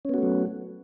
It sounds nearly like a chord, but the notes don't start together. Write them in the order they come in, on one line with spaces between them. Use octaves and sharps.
C#4 B3 F#4 A3 F#3